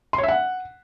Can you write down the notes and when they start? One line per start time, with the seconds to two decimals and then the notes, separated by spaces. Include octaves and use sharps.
0.13 C6
0.18 C#5
0.23 E5
0.29 F#5